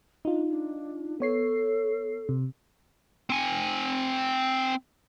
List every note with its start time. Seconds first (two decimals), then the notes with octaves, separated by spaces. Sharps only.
0.25 D4 D#4 F4
0.48 D4
1.20 B3 A4 C#5 C7
2.29 C3
3.30 C4 G#5